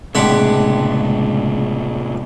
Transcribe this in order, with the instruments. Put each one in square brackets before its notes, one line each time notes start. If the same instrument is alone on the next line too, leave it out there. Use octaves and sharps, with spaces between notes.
[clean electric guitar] C#2 D4 G4 [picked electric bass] A2 C3 [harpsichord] G#3 F#5 B5